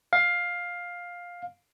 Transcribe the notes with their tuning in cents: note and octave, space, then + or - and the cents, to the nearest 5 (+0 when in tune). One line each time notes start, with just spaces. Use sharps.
F5 +10